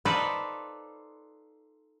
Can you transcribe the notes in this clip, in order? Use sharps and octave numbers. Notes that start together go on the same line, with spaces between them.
D#4 F4 A4 B4 C5 D5